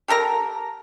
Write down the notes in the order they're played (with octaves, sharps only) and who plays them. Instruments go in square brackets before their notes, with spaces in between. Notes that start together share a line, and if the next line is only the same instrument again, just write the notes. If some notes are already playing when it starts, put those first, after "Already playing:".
[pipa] G4 A4 A#4 A#5